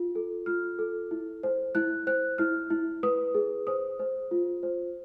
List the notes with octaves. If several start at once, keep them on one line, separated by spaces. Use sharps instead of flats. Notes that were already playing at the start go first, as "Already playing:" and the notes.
Already playing: F4
A4
F4 F6
A4
E4
C5
E4 F#6
C5 F#6
E4 F6
E4
B4 D#6
G#4
C5 D#6
C5
F4
C5